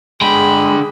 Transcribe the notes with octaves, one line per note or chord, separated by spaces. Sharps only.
D3 G#3 G#4 G5 B5